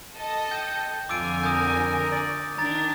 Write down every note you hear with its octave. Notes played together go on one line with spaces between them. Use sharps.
A4 D#5
G5 G6
F2 D3 F4 G#5 D6 E6 D7
A#4 D#6 G6
D5
D#3 D4 A#5 A6